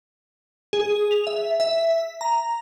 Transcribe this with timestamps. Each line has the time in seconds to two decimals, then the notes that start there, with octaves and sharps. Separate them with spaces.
0.73 G#4
1.11 F7
1.27 E5
1.60 E5
2.21 A#5